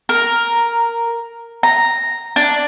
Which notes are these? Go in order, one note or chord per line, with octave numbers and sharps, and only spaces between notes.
A#4
A#5
D4